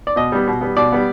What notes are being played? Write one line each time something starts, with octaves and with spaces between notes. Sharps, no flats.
D5
B2 D#5
G3 B3
B2
G3 B3
B2 D5
G3 B3